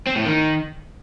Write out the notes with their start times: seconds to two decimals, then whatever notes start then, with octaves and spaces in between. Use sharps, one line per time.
0.07 C4
0.16 A2
0.25 D#3